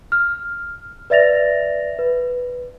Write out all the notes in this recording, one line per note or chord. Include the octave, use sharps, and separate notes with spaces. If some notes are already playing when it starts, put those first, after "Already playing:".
F6
B4 D5 E5 A6 A#6 F7
B4